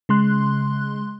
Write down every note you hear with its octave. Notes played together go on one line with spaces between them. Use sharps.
C#3 G#3 C6 F#6